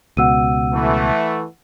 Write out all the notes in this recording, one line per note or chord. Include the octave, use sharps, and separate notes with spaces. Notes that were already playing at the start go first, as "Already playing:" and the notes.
C#2 B2 F#5 E6 D#7
E3 A3